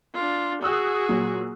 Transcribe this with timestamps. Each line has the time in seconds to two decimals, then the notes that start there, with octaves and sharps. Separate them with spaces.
0.15 D4 F4
0.62 F#4 G#4 D#6 E6 F#6
1.09 A#2 F#3